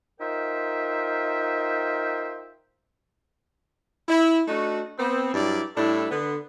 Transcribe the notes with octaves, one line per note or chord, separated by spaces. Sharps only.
D#4 F4 A#4 C5 E5 G5
E4
A3 D4 D#4 F#4
B3 C4
G2 F#3 G3 E4 D5
A2 G3 D4 E4 A4
D3 B3